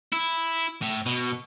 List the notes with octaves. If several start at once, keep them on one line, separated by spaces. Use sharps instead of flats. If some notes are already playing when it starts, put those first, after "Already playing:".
E4
A2
B2